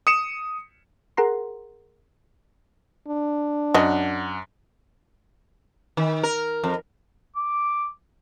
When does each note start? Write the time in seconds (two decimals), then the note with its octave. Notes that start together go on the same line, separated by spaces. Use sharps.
0.07 D#6 C#7 E7
1.17 G#4 A#4 F#5 A#5 C6
3.08 D4
3.74 F#2 F#4 D#5 F#5
5.97 D#3
6.23 A#4
6.64 F2
7.36 D6